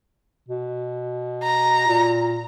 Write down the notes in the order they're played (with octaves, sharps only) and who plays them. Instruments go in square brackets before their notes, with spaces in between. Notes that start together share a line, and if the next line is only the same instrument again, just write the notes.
[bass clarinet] B2
[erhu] A#5
[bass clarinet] A#2